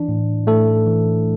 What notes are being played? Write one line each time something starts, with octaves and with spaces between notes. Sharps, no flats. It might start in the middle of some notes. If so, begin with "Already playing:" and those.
Already playing: E3 D4
A2
A2 A3 A4
E3